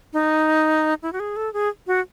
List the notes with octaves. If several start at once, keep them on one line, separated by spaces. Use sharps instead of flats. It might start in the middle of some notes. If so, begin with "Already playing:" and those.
D#4
E4
F#4
G#4
A4
G#4
F#4